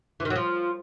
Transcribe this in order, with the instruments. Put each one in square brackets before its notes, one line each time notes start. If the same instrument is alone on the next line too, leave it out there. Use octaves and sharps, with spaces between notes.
[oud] E3
D#3
F#3
F3